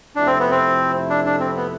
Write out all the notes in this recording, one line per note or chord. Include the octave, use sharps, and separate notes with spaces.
F2 C3 F3 A3 D4 E4
C4
B3
C4
D4
D4
C4
B3